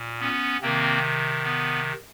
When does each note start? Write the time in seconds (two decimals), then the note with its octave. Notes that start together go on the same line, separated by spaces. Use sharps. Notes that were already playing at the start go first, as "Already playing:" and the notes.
Already playing: A#2
0.20 B3 C#4
0.61 C3 D#3 A#3 C4
1.44 B3